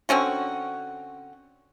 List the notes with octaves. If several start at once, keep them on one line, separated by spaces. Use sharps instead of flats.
D3 C4 C#4 F#4